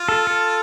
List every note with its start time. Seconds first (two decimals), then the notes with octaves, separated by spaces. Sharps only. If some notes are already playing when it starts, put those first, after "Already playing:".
Already playing: F4
0.09 A4
0.27 A4